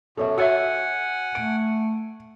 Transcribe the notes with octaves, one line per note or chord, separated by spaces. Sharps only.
F#2 B2 A4 C#5 E5
F#4 C#5 E5 F#5 G#5 E6
A3 D7